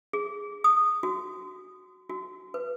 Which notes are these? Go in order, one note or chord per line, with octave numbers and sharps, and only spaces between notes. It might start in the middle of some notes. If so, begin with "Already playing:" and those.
G#4
D#6
F#4
F#4
B4